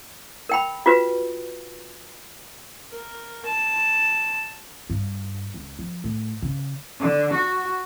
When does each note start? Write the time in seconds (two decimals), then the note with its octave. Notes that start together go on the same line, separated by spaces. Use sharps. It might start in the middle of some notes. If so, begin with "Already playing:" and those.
0.49 A#4 G5 B5
0.86 F4 F#4 B4
2.91 A#4
3.45 A5
4.90 G2
5.54 C#2
5.79 F3
6.04 A2
6.42 C#3
6.98 D3
7.34 F#4